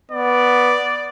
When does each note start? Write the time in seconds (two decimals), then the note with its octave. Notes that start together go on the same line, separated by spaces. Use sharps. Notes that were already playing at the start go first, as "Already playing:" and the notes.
0.11 B3 D5